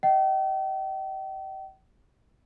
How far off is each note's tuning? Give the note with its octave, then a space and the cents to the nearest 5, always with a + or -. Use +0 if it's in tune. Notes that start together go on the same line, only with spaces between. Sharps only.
D#5 +20 G5 -40